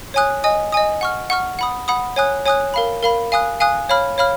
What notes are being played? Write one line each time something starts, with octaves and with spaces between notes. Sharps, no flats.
C#5 G#5 D#6 F#6
D#5 G#5 D#6
D#5 G#5 D#6
F#5 C#6 F6
F#5 C#6 F6
F#5 B5 D#6
F#5 B5 D#6
C#5 G#5 D#6 F#6
C#5 G#5 D#6 F#6
A#4 F5 B5
A#4 F5 B5
F5 G#5 D#6 F#6
F5 G#5 D#6 F#6
C#5 F5 B5 F6
C#5 F5 B5 F6